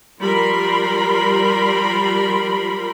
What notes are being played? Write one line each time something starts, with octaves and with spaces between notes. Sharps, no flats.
F3 G3 A#4 B5 C6